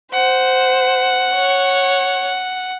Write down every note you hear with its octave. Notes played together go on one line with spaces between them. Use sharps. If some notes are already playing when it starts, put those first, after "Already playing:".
C5 F#5
C#5